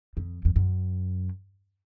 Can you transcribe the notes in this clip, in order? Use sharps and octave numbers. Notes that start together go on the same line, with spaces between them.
F2
F2
F#2